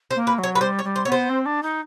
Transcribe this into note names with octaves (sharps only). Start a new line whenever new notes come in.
C5
A#3
B4
F#3 C#5
B4
G3 C5
C#5
G3
C5
B3 C#5
C5
C4
D4
D#4